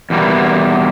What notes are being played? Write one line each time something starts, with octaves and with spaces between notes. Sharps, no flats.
E2 B2 G3 A#3